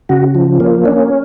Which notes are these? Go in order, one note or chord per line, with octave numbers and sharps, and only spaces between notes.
C#3 F#4
F3
A#3 C#4
C#4 D4